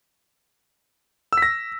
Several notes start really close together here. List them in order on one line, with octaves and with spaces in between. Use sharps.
E6 B6 A#6